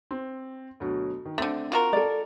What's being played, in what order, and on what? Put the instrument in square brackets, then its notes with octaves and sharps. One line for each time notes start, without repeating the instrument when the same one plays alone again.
[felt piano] C4
D2 B2 F#3
D#3
[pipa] D3 A3 [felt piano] C4 A6
[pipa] F4 F#4 A#4
[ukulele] A4 D5